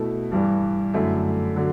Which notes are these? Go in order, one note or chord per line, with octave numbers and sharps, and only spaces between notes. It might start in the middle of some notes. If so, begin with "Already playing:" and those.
Already playing: B2 A3 E4 A4
G2 E3 G3
F#2 D3 A3 E4
D3 F#3